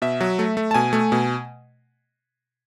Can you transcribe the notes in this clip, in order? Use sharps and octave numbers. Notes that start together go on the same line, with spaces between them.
B2 E5
F#3
A3
A3
A5
B2 G#5
A3
B2